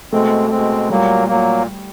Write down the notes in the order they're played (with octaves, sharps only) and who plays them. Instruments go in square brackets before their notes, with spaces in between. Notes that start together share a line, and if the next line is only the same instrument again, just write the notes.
[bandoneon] B2 G#3 C4 [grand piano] A3
[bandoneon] B2 G#3 C4
[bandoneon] A#2 F#3 A#3 [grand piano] G3
[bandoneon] A#2 F#3 A#3